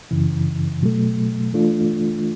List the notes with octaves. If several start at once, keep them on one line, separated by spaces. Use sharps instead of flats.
F#2 C#3 E3
B2 F#3 A3
E3 A3 D4 F4